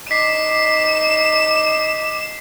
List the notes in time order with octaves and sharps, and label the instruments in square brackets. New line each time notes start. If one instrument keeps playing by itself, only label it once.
[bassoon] D#4 [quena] D6 [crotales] B6 C7 [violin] E7